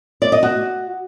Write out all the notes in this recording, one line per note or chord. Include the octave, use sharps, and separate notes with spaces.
D5
D#5
F#4